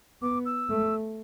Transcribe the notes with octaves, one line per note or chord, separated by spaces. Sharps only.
B3 D6
E6
A3